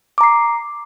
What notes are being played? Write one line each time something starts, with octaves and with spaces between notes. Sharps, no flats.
A#5 D6 C7